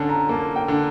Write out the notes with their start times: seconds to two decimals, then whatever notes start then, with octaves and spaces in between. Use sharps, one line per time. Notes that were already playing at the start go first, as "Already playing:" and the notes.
Already playing: D3 C#4 A5
0.09 A#5
0.29 A#3 A5
0.56 G5
0.68 D3